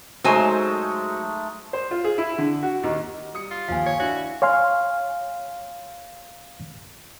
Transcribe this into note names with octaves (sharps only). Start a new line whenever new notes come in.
F#3 G#3 A3 D#4 C5 G#5
C5
F4
G#4
E4
D3
F#4
D#2
G3 D#6 C#7
F4
D#2 F3 F5 G#5
C#5
D4 E4 F#4
C#5 F5 G#5 C6 F6